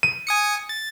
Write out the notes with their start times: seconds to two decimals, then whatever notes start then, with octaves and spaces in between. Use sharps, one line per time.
0.03 D#7
0.27 G#5 D#6 C#7
0.69 A6